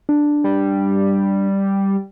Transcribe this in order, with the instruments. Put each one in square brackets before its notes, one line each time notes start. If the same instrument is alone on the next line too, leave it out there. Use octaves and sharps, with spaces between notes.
[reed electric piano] D4
[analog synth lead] G3